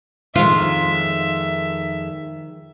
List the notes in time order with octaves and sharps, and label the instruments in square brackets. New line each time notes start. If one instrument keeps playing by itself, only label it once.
[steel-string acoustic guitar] F2 G#3 [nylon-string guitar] D#3 D#4 [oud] F4 [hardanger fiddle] E5